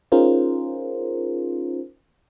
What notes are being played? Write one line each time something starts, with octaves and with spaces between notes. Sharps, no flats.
C#4 D#4 F4 G#4 A#4 C5